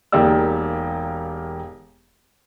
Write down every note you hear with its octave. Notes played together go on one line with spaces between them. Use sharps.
E1 A#3 D#4 G4 D5 E6